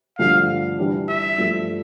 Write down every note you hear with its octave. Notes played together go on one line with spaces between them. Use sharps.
G2 D3 F3 A3 F5
E3 G3 D4
E5
G2 F3 A3